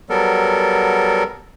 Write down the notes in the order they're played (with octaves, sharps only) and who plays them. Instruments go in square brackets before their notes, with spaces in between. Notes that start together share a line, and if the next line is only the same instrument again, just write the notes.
[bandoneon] F#3 G3 B3 A4 A#4